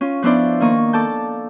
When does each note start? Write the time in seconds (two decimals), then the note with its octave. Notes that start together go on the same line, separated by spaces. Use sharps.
0.01 C#4 F4
0.22 F3 B3 D4 E4 C5 D5
0.60 D#3 A#3 D#5 C#6
0.93 A4 D5 A5 G6